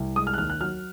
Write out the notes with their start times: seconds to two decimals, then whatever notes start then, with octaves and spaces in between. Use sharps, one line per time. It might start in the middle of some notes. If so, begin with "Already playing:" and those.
Already playing: C2
0.16 G#3 D#6
0.27 F6
0.34 F#6
0.38 D#2 F6
0.50 F#6
0.61 F#3 F6